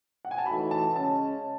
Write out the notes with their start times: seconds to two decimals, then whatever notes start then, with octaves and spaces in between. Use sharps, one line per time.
0.25 F#5
0.31 G#5
0.38 A5
0.46 A2 E3 A3 D#4 F#4 B5
0.71 A5
0.96 C#3 G#3 C#4 A5